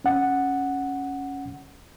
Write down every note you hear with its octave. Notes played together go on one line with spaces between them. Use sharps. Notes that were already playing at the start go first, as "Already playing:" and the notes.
C#4 F#5